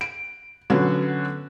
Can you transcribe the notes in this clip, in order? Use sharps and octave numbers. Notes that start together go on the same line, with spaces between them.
D7
D3 F#3 B3 C#4 F#4